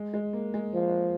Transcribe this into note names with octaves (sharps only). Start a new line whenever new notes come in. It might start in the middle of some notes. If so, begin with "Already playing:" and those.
Already playing: G#3
G#3
A#3
G#3
F3